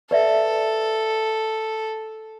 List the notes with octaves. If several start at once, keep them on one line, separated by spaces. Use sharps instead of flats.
A4 B4 D5 E5